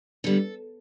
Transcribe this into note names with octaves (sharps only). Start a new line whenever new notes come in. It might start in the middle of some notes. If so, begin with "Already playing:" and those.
D3 G3 B3 A4